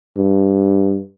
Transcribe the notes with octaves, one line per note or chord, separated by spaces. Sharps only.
G2